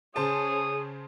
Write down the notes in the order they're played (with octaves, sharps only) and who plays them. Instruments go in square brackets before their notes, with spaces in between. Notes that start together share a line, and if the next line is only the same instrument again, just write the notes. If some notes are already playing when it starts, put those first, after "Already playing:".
[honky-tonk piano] C#3 C5 A5 [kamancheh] G#4 C#5 [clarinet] D#6